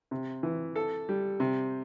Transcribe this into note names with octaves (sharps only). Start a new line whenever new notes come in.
C3
E3
A4
G3
C3